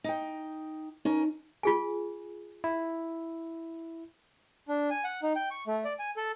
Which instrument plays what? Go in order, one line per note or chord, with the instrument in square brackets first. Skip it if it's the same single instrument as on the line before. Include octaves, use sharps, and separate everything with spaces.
[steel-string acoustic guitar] D#4 G5
[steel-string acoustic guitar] C#4 A#4 [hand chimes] D#4
[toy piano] F4 G#4 G#5
[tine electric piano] E4
[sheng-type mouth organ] D4
G#5
F#5
D#4
G5
C#6
A3
D5
G#5
A4